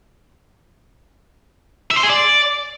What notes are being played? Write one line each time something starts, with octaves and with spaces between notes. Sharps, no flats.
E5
C5
G#4
D5